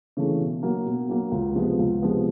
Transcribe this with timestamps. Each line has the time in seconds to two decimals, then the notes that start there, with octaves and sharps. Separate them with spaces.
0.17 C#3 E3 A3
0.40 B2
0.63 F#3 A#3
0.86 B2
1.09 F#3 A#3
1.32 C#2
1.55 C3 F3 G#3 B3
1.79 C#2
2.02 C3 F3 G#3 B3